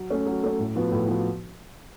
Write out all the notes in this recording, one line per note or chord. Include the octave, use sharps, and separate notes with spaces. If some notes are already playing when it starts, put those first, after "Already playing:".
Already playing: F#3
A3 C#4
F#3
A3 C#4
A2
F3 B3 F#4
A2
F3 B3 F#4